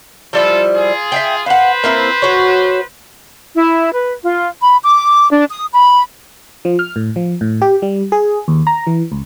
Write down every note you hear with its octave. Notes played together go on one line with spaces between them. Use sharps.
F3 G3 E4 F4 A4
F4 G#4
E5 F5 G5
B4 C5 F5 F#5
A#3 C4 E4
F#4 C#5
E4
B4
F4
B5
D6
D4
D#6
B5
F3
F6
A2
F3
A2
G4
G3
G#4
D#2
A#5
E3
C#2